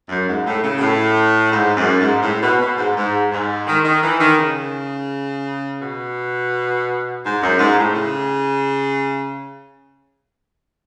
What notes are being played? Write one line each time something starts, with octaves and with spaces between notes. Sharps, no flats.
F#2
G#2
A2
C#3
B2
A2
G#2
F#2
G#2
A2
B2
B2
G#2
G#2
G#2
D#3
D#3
E3
D#3
C#3
B2
G#2
F#2
G#2
A2
C#3